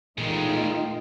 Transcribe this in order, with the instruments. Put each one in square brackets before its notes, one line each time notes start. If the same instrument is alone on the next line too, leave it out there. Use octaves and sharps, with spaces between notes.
[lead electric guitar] E2 G#3 [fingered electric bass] A#2 E3 [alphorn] D#3 [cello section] A3 D#4 F4